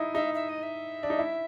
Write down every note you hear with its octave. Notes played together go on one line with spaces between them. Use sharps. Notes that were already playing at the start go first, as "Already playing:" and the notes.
Already playing: D#4 E4
D#4 E5
E5
D#5
E5
D4
D#4
E4